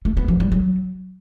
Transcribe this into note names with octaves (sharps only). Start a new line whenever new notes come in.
A3
B3
F3
G3
F#3